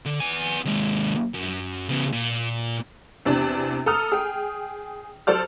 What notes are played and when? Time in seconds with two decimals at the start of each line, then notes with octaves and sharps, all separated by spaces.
0.05 D3
0.20 B3 G#5
0.65 D#2 G#3
1.34 F#2
1.89 C#3 B3
2.13 A#2
3.25 E2 C3 D4
3.86 A4 A#5 D#6 F6
4.12 G#4 G5
5.27 F#3 A4 C5 D5 A5 F6